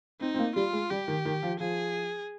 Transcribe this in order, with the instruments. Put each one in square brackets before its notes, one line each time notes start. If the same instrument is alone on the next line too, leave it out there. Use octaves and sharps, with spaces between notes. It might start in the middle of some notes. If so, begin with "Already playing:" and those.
[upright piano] C4 [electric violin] D#4
[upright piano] C4
A#3
[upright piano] G3 [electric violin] F4
[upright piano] G#3
[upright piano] G3 [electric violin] G4
[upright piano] D#3
D#3
F3
[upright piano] F3 [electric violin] G#4